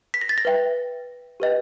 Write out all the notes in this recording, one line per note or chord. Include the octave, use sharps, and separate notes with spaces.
B6
A#6
A6
A#6
B4 E5 G5
G4 B4 D#5 G5